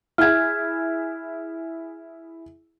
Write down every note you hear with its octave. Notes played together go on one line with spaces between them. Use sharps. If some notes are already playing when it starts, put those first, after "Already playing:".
E4 G#4 E5 F6 G#6